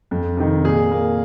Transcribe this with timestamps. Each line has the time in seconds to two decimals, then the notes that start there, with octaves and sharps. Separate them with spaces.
0.11 F2
0.37 C3 D#3
0.64 A#2 G#4
0.91 A#3